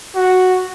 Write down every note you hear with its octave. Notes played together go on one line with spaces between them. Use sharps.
F#4